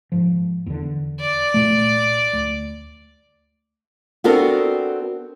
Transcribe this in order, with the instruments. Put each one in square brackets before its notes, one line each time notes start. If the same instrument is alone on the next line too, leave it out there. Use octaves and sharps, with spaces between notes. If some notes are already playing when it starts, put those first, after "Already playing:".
[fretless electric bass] G#2 F3
E2 D3
[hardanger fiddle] D5
[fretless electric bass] C2 A#2 A3
D2
[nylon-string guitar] B3 C4 D4 F#4 A4 A#4